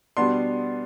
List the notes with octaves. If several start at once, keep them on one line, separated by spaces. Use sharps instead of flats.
B2 G3 B3 D4 C6